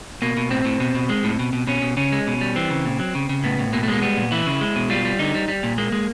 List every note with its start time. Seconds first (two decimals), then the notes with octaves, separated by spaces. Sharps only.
0.22 B2 A#3
0.37 B2
0.50 A2 C4
0.65 A2
0.80 B2
0.95 B2
1.09 G#3
1.24 A2
1.39 B2
1.53 B2
1.67 B2 C#4
1.82 B2
1.97 C#3 C#4
2.12 G#3
2.27 B2
2.41 G3
2.56 E3 C4
2.70 C#3
2.85 A#2
3.00 F#3
3.15 C#3
3.29 C#3
3.44 A2 B3
3.59 A2
3.73 B2 A#3
3.83 A3
3.88 G#3 A#3
4.02 G3 B3
4.17 A#2
4.32 E3 E4
4.46 C#3
4.61 G#3
4.76 B2
4.90 G3 F4
5.05 G3
5.19 D3 D#4
5.34 G3
5.48 G3
5.63 A#2
5.78 G#3 A#3
5.92 G#3